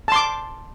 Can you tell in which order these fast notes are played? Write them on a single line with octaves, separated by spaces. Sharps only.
A5 C6 D6